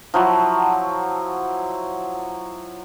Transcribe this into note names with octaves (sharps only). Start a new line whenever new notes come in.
F3 F#3 E4 F#4